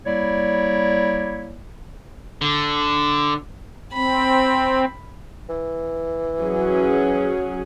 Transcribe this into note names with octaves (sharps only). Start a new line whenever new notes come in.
G3 A#3 E4 C#5 D5
D3
C4 B5
E3
F#3 C#4 G#4